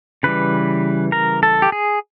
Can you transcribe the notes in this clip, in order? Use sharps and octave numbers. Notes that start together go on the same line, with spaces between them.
C#3 E3 G3 B4
A#4
A4
G4
G#4